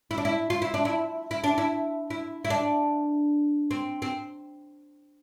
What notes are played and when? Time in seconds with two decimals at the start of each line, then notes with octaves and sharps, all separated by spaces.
0.11 E4
0.18 D4
0.25 E4
0.50 F4
0.62 E4
0.74 D4
0.85 E4
1.31 E4
1.44 D4
1.58 E4
2.10 E4
2.45 E4
2.50 D4
3.71 C4
4.02 C4